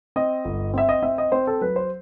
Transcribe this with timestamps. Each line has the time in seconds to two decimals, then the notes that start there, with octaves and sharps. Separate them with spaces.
0.16 C4 D#5
0.45 G1
0.74 C4 E5
0.89 D#5
1.02 C4 E5
1.18 D#5
1.32 C4 C5
1.47 A4
1.61 F#3 B4
1.76 C5